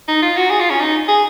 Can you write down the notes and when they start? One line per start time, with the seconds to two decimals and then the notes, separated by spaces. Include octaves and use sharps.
0.08 D#4
0.22 F4
0.37 F#4
0.51 G#4
0.60 F4
0.70 C#4
0.80 D#4
1.08 G#4